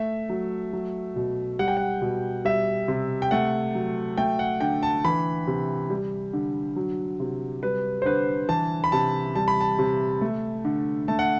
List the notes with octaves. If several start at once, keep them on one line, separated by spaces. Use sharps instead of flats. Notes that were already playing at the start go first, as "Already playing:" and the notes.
Already playing: A3 E5
F#3
F#3
B2
G3 F#5
G5
F#5
B2
G3 E5
C3
G5
A3 F#5
F#3
A3 G5
F#5
D3 G5
A5
E3 B5
C3
G3
D3
F#3
C3
G3 B4
C5
D3 B4
E3 A5
B5
C3 A5
G3 A5
B5
A5
C3
A3
D3
A3 A5
F#5